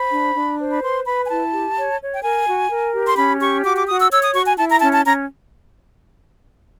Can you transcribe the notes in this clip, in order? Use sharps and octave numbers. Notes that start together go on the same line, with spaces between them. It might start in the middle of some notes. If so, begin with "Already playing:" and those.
Already playing: C5 B5
D4
D4
C5
B5
B4 C6
B4 B5
G#5
E4 A5
G4
C#5
C#5
G5
A#4 G#5
F#4
A#4
G4
C6
C#4 B5
G4 C#6
F#4 D6
D6
F#4 D#6
E6
C#5 E6
D#6
F#4 C#6
G#5
E4 A5
A#5
C#4 A5
A5
C#4 A#5